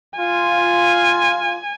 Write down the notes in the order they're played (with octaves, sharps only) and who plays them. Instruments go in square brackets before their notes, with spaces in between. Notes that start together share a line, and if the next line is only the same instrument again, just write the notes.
[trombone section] F4 [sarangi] G#5